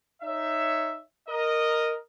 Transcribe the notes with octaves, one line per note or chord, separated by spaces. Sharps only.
D#4 C#5 E5
A#4 D#5